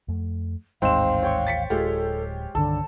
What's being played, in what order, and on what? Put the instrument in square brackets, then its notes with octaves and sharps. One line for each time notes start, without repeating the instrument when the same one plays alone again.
[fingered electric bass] F2 A3
[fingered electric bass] A1 D#2 [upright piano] G#2 E7 [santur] C4 [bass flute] F5
[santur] C#5 G5 C#6
[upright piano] A6 B6 C#7
[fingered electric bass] D1 [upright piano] G#3 F4 G4 [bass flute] A4
[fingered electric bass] C2 G2 D#3 [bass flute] D3 [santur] A4